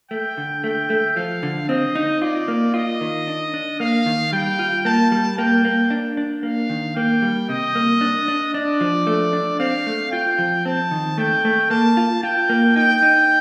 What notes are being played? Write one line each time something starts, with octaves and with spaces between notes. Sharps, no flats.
A3 G5
D3
A3 G5
A3
F3 F5
D3
C4 D#5
D#4
F4 D5
A#3
F4 D#5
D#3
D4
D4
A#3 F5
D#3
G3 G5
F4
A#3 A5
G3
A#3 G5
A#3
D4
D4
A#3 F5
D#3
A#3 G5
G3
C3 D#5
A#3
D4
D4
D4 D5
F3
A3
D4
C4 F5
A3
F4 G5
F3
C4 A5
D#3
A3 G5
A3
A#3 A5
F4
F4 G5
A#3
D#4 G5
D#4